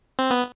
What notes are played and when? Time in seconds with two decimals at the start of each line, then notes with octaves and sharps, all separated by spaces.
0.19 C4
0.31 B3